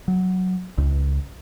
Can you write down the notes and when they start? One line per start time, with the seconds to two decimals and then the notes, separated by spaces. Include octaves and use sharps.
0.08 F#3
0.78 C#2